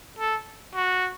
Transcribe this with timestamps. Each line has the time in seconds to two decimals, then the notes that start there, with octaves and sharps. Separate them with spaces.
0.19 A4
0.75 F#4